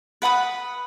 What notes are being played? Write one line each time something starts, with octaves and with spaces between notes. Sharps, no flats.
B4 F#5 B5 D#6